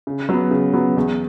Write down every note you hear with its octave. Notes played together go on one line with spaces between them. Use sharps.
C#3
F#3 B3
C#3
F#3 B3
E2